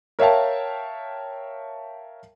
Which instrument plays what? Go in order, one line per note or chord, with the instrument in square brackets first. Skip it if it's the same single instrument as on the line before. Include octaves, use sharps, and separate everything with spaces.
[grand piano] A#4 C#5 E5 F5 G5 A5